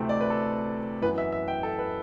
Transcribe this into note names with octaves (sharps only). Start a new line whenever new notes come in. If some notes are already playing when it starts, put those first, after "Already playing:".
Already playing: D2 C3 E3 A3 C4
D5
B4
A4
F#2 E3 B3 B4
E5
E5
G5
A4
B4